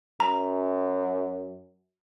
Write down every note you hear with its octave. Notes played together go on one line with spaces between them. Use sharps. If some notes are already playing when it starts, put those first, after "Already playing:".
F#2 A#5